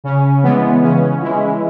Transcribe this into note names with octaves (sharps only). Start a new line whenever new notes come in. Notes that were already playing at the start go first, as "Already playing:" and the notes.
C#3 C#4
E3 G#3 B3
C#3 C#4
E3 G#3 E4
C#4
E4